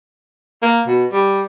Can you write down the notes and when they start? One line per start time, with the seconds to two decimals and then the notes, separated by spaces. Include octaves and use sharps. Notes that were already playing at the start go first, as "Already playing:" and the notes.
0.62 A#3
0.87 B2
1.12 G3